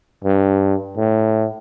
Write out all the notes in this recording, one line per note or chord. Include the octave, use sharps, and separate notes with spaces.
G2
A2